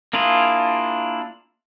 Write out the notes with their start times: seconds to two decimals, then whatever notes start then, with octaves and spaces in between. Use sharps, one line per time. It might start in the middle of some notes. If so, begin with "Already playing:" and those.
0.13 A#3 D4 E4 F4 G#4